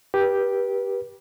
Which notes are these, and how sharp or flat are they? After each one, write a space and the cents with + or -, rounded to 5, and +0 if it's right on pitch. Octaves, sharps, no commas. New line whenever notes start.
G4 +0 B4 -30